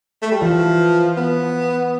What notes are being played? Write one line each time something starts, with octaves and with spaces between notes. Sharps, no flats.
A3
G3
E3 F3
B3